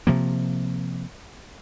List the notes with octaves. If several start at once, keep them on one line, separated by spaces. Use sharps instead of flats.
C3 F3 A#3